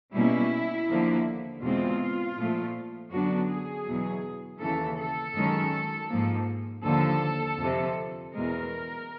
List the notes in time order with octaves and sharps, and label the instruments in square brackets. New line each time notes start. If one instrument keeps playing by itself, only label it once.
[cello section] B2 G3 A#3 C#4 E4
D#2 D3 F3 A#3
E2 B2 G#3 C4 F4
A#2 F3 A3
F#2 D3 F#3 B3 D4 F#4
G#4
E2 B2 F#3
D#2 C#3 E3 A4
A4
F#2 D#3 G#3 C#4
G#2 F3 A#3
D#2 D3 F3 A4
F2 C3 F3
E2 B2 G#3 A#4